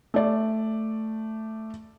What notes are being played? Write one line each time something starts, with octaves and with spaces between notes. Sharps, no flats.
A3 D5